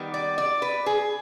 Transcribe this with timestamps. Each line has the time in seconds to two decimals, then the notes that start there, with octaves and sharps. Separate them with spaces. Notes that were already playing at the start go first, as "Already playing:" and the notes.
Already playing: D#3 G3 B3
0.14 D5
0.38 D5
0.62 B4
0.86 G#4